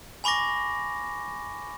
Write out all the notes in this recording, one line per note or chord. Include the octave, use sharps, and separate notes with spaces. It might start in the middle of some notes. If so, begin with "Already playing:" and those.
G#5 B5 C#6 D6 A#6